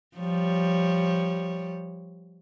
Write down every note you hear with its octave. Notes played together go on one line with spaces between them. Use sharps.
F3 G3 C#5